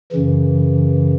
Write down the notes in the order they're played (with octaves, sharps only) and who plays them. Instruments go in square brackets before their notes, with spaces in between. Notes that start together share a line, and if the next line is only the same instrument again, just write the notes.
[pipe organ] F#2 C#3 E3